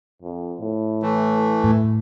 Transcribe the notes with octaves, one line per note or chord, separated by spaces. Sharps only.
F2
A2
E3 A3
A2